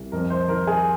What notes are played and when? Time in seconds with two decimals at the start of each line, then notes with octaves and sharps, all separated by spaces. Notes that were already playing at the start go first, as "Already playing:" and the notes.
Already playing: C2
0.12 F2 A#4
0.30 C5
0.48 D#3 A#4
0.67 G#4